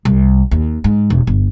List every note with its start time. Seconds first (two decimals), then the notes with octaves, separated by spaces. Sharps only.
0.05 C2
0.51 D#2
0.84 G#2
1.10 E1
1.27 G1